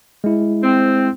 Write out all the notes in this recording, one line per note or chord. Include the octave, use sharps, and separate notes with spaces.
G#3 E4
C4